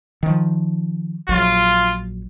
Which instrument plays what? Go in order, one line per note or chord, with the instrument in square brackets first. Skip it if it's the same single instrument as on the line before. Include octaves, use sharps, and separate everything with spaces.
[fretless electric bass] D#3 F3
[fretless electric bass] A#1 F#3 [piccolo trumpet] F4